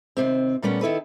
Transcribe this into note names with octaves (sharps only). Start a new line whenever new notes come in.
D#2 G#2 C3 C4
A#2 G3 A3 B3 C#4
D#3 E4 A4 B4